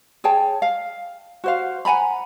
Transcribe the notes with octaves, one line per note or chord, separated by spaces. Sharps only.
G#4 C#5 G5 A5
F5
F#4 C5 F5
F#5 G#5 A#5 B5